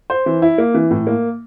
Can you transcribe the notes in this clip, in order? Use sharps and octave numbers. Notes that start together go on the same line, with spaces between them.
C5
E3
E4
A#3
E3
A2
A#3